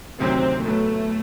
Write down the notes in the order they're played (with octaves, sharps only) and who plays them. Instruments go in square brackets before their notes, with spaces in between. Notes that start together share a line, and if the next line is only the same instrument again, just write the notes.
[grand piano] D2 C3 D#3 F#3 [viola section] C4
[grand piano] A2 F#3 B3 [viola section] A3